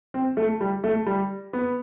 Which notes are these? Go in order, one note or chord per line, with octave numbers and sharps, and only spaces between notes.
C4
A3
G3
A3
G3
B3